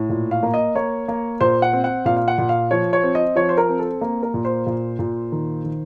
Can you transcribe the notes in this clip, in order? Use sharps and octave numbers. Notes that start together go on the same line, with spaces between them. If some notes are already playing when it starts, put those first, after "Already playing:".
Already playing: A2
A#2
F5
A#3
D#5
A#3 C#5
A#3
A#2 C5
F#5
C4
F#5
A#2 F5
F5
F#5
A#2
F5
F3 C#5
C#5
C4
D#5
F3 C#5
C5
A#4
C4
A4
A#3
A#4
A#2
C5
A#2
A#2
D#3
D#3